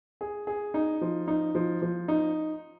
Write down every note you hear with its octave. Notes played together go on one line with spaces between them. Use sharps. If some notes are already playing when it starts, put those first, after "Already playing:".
G#4
G#4
D#4
F3
D#4
F3
F3
D#4